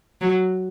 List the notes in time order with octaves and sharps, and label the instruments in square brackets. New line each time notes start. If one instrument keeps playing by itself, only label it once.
[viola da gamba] F#3